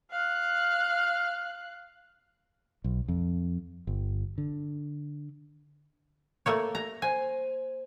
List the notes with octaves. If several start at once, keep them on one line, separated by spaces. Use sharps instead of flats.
F5 F#6
B1
F2
G1
D3
A3 A#3 C#5
A#5 G#6
C5 G#5